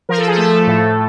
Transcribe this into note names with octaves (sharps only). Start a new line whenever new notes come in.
F3 A#4
A4
G#4
A3 A4
A2